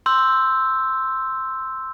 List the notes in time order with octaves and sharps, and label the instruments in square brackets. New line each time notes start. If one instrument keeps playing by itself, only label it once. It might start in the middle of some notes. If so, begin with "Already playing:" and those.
[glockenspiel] C6 E6 G6